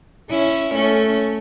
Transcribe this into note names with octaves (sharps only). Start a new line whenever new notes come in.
C#4 E4
A3 C#4